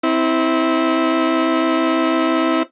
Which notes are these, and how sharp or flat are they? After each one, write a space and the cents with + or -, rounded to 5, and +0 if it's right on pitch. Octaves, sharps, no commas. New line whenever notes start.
C4 +0 E4 -20